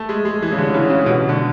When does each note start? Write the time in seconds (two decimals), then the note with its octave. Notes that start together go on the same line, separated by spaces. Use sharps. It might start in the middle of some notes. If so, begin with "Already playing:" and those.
Already playing: A3
0.09 G#3
0.25 G#3
0.42 E3
0.52 C#3
0.58 D3
0.74 C#3
0.90 C#3
1.06 B2
1.29 D3